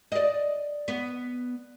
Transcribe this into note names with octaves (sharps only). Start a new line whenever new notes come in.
D5 D#5
B3